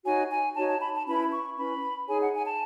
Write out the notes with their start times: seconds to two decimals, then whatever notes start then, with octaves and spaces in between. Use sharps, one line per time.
0.05 D#4 F#4 C#5 G#5
0.30 G#5
0.56 D#4 F#4 C#5 A5
0.69 A5
0.81 B5
0.94 A5
1.06 C#4 E4 B4 B5
1.32 C#6
1.57 C#4 E4 B4 B5
2.08 D#4 G#4 C#5 G#5
2.20 F#5
2.33 G#5
2.46 A5